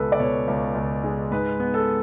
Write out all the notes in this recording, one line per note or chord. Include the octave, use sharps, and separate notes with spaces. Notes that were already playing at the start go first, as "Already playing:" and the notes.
Already playing: C#2 B2 A4 B4
D5
B2 C#5
C#2
C#2
G#3
G#2 B4
B3
A4